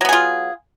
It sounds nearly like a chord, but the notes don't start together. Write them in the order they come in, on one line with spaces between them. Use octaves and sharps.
F#3 B3 G#4 F4